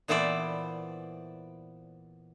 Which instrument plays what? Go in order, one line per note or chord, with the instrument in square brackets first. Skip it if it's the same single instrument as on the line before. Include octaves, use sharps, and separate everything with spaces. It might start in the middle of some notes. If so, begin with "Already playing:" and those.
[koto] A#2 E3 B3 E4 C5 D5